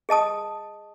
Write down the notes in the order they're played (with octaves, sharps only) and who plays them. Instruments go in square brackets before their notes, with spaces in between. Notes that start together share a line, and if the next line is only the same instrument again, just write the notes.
[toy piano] G#4 D#5 A5 D#6